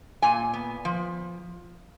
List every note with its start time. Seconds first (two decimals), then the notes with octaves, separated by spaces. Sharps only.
0.22 A#2 G#5
0.53 B3
0.85 F3